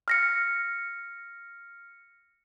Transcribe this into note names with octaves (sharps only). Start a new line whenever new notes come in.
F6 A#6 C#7